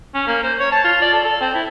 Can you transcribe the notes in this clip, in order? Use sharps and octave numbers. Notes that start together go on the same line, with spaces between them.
C#4
A#3
C5
C#5
A5
F4
D5
A4
A4
C4
E4